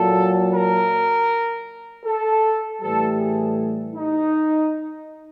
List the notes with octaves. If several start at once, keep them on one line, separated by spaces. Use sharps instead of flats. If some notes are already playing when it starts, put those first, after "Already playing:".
Already playing: A#2 F#3 A4
A#4
A4
A2 E3 G3 A4
G#4
D#4